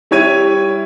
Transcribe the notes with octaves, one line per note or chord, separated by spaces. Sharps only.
G3 E4 C#5 G#6 D#7